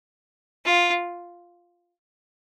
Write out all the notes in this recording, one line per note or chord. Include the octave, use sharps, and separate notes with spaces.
F4